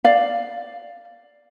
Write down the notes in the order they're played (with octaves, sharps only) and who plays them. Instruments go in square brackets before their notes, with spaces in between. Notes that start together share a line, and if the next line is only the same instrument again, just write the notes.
[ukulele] D5 F5